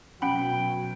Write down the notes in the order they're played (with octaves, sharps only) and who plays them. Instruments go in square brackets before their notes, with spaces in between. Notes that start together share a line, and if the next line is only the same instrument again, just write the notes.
[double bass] B2 F#3 [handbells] C#4 F#5 B5 [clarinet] G5